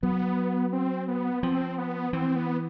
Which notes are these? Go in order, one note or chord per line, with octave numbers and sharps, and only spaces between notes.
F#3 B3
C4
B3
F3 C4
B3
E3 C4
B3